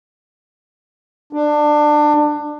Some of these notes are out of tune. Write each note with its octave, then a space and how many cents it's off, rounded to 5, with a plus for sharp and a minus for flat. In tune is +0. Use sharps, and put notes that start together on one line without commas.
D4 +20